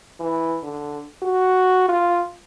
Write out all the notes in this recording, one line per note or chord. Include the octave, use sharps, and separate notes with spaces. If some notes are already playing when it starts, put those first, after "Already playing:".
E3
D3
F#4
F4